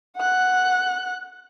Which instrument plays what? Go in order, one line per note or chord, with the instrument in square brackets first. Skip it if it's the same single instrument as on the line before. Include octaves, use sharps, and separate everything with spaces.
[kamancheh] F#5 F#6